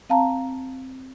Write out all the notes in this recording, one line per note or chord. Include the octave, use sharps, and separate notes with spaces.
C4 F5 A5 A#5